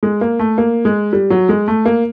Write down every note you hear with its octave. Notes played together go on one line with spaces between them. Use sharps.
G#3
A#3
A3
A#3
G#3
G3
F#3
G#3
A3
A#3